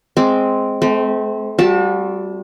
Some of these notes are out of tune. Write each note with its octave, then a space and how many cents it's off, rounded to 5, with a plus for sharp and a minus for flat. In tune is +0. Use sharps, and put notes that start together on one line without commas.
G#3 +10 C4 +0 D6 +0
A3 -45 C4 -20
G3 -15 F#4 -45 A5 +0